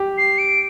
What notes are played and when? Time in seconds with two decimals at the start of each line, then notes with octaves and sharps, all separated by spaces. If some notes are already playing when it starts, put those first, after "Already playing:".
Already playing: G4
0.18 C7
0.38 D7